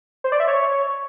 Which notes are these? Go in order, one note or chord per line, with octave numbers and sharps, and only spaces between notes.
C5
D5
E5
C#5